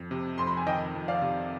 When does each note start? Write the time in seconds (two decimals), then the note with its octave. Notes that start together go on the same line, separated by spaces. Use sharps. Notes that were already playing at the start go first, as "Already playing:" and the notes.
Already playing: F2
0.11 C3
0.38 F2 C6
0.47 B5
0.57 G#5
0.67 D#3 D#5 G5
0.95 F2
1.08 D5 F5
1.22 C3